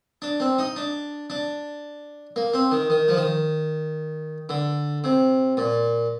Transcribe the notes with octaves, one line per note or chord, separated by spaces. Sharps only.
D4
C4
D#4
D4
D4
A#3
C4
D#3
D#3
F3
D#3
D3
C3
A#2